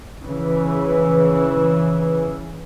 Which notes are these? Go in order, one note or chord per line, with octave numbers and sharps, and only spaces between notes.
C#3 E3